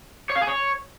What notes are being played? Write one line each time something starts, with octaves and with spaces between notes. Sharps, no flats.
C#5
F5
G#4
C#5